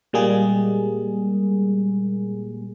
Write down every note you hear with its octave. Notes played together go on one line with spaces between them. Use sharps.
A#2 G3 G#3 A#3 G#4